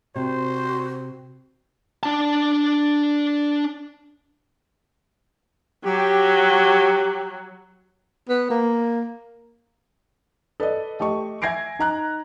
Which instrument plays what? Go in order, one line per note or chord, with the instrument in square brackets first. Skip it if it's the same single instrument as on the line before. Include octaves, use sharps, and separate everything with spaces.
[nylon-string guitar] C3 [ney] F#4 [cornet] C5
[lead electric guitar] D4 A5
[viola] F#3 [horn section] G4
[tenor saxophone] B3
A#3
[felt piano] A4 B4 D5 D#5
A3 G4 D#5 C#6
E5 G#5 G#6 A#6 C7 D7
D#4 A#5 F#6